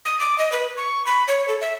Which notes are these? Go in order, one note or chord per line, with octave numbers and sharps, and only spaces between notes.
D#6
D6
D#5
B4
C#6
B5
C#5
A4
E5